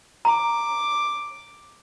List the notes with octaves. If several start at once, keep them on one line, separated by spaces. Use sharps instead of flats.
A#5 D6